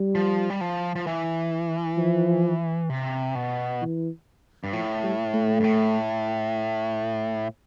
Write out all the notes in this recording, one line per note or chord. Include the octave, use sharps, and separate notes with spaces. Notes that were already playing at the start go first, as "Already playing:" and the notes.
Already playing: G3
F3
G3
F3
F3
E3
F3
C3
B2
E3
G2
A2 F3
G3
A3
G2
A2